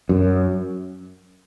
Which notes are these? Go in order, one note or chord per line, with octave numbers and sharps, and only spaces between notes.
F#2